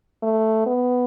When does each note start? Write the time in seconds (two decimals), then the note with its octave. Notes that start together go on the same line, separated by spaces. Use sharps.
0.23 A3
0.66 B3